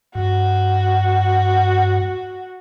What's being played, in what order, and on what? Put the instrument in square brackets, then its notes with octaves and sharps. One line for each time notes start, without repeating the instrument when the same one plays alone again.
[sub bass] G2 [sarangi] F#4